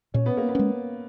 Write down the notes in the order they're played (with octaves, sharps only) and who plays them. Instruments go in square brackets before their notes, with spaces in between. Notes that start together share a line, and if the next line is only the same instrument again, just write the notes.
[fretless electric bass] A#2 [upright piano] C#4
[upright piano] B3
A#3
B3
[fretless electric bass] G#3 C#4